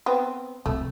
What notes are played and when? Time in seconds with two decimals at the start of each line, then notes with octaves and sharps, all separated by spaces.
0.06 B3 C4
0.66 C3 F3 A3